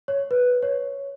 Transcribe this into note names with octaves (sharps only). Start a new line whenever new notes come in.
C#5
B4
C#5